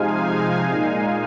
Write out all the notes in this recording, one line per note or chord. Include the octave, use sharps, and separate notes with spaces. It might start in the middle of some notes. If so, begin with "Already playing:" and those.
Already playing: C3 F3 G#3 D#4 F5 G#5
A#2 G#3 D#4